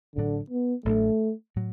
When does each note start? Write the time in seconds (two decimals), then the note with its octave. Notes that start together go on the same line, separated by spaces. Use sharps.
0.15 A1 A2 D3 F#3 D4
0.50 B3
0.85 A1 A2 F#3 A3 D4
1.56 A2 F#3